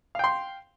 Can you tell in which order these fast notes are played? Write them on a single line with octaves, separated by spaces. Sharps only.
F5 G5 C6